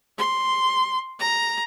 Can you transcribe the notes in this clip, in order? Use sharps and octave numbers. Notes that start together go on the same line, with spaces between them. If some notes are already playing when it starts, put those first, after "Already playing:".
C6
A#5